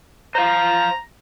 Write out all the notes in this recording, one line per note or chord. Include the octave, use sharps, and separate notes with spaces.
C5 F5 A#5